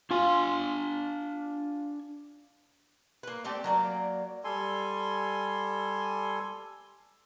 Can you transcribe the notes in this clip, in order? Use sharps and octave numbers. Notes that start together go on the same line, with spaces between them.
D4 F4 G#5 C6
A#3 B4
A3 C4 G4 D5
F#3 A#3 D5
G3 A4 G#5 C6